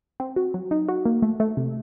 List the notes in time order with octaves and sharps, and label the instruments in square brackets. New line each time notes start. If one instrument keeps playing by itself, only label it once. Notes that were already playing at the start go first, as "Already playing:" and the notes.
[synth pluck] C4
F#4
F#3
D#4
F#4
A#3
A3
A3
C3